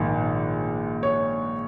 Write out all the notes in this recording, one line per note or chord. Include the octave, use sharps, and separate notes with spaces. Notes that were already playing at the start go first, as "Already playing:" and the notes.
Already playing: A#1 G#2 D#3
C#5